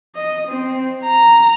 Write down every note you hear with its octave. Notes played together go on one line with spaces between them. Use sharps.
D#5
C4
A#5